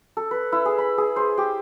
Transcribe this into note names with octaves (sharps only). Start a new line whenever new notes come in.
A4
B4
E4
G#4
B5
G#4
C5
G4